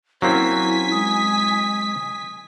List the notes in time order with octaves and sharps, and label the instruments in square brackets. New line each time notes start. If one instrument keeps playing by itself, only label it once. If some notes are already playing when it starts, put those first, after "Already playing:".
[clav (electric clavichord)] F#3 A#3 C4 [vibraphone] C#4 [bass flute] E4 [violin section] G#5 B6
[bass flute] G#3 [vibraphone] D#6